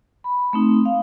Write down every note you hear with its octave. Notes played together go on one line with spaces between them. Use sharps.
B5
A3 C4 D#4
F5